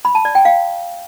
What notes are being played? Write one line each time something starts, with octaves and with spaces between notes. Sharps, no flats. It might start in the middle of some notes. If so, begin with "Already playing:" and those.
B5
A5
D5
G5
F5